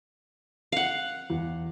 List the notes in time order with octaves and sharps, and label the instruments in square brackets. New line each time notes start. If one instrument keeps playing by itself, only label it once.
[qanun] F5 F#5
[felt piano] E2